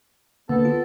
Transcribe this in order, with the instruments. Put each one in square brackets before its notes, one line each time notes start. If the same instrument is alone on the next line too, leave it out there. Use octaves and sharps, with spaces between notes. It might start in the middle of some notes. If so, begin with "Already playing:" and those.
[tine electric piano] D3 A#3 [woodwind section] B3 A4
[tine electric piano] F4